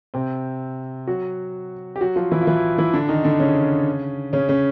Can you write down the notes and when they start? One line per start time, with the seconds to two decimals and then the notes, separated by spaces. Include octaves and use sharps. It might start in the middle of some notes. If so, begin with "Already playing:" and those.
0.14 C3 C4
1.07 F#3 F#4
1.96 G4
2.01 F#3 F#4
2.16 F3 F4
2.31 E3 E4
2.42 F4
2.47 E3 E4
2.78 E3 E4
2.93 D3 D4
3.09 D#3 D#4
3.24 D3 D4
3.40 C#3 C#4
4.33 C#3 C#4
4.49 C#3 C#4